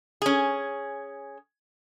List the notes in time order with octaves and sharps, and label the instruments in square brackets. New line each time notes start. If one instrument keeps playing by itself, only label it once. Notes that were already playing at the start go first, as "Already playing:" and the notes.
[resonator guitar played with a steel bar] C#4 G#4